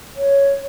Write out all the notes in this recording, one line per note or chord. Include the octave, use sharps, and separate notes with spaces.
C#5